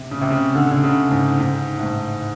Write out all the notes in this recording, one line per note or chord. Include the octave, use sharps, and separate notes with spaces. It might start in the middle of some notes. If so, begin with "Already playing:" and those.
Already playing: C3
C#3
C3
C#3
D3
D3
C#3
G#2
G#2
A2
G#2